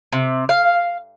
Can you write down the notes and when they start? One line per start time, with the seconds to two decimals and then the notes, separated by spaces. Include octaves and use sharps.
0.13 C3
0.49 F5